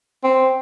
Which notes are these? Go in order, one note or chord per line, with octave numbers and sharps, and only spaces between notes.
C4